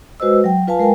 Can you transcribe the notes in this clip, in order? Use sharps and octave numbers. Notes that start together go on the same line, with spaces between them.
G#3 F#4 B4 C5 D#5 E6
F#3 G5
F4 B4 F5 G#5 A5
G#3 A#4 G5 G#5